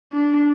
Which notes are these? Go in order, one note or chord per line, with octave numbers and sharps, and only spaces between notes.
D4